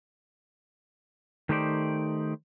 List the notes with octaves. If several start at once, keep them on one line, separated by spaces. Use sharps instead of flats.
D#3 A3 D#4 G4 C5 D5